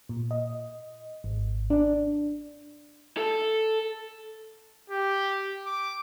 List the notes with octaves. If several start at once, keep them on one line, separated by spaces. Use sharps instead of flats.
A#2
D#5
G#1
D4
A4
G4
D6